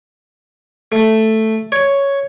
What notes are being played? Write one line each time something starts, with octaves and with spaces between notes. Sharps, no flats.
A3
C#5